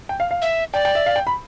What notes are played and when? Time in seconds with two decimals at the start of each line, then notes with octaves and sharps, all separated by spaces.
0.09 G5
0.20 F5
0.31 F5
0.42 E5
0.74 D5 G5
0.85 G5
0.95 E5
1.06 F5
1.16 G5
1.27 B5